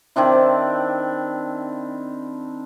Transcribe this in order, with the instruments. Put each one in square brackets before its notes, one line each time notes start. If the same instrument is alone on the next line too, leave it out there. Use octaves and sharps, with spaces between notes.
[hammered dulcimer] D#3 C4 D4 E4